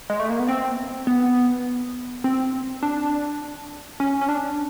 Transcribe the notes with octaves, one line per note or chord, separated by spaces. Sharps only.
G#3
A3
A#3
B3
C4
B3
C4
D4
C#4
C#4
D4